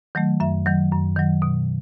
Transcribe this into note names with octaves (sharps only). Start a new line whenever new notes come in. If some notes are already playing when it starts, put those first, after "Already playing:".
D#3 F#3 A3
F#2 E5
D#3 F#3
F#2
D#3 F#3
B2